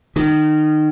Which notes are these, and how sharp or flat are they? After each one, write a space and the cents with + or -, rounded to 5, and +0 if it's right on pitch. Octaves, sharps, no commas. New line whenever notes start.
D#3 -25